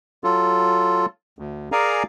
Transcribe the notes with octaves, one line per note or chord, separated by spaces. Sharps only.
F#3 F4 A4
D2
G#4 A#4 D5 F5 G#5 A#5